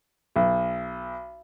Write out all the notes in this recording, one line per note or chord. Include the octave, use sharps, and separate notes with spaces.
B1